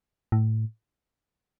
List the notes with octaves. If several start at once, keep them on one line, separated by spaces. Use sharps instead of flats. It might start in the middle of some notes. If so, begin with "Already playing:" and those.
A2